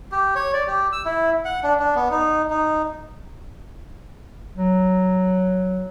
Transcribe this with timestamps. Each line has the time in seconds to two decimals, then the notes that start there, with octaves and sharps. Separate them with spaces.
0.12 G4
0.36 C#5
0.54 D5
0.67 G4
0.92 E6
1.05 E4
1.45 F#5
1.63 D4
1.80 D4
1.95 B3
2.11 D#4
2.50 D#4
4.55 F#3